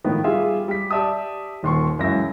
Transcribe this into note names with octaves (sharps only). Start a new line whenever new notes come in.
A2 D#3 F3 B3
G3 F4 G#4 E5
G3 B6
G4 D5 E5 A5 D#6
D#1 D#2 C6 C#6
C#2 F#2 C#3 E3 E5 A#6